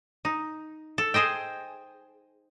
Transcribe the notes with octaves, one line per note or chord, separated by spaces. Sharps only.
D#4
A4
G#4 C5 D#5 G5